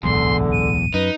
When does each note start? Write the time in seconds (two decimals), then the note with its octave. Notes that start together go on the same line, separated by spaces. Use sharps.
0.03 D1 B1 E2 G#2 D3 C6
0.52 D#7
0.94 F#2 D#4 B4